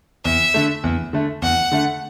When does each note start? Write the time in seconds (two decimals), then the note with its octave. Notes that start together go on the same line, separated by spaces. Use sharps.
0.25 E2 E5
0.54 D3 A3
0.84 E2
1.13 D3 A3
1.42 E2 F#5
1.72 D3 A3